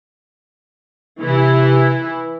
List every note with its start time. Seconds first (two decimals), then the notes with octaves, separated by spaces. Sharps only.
1.21 C3 E3 E4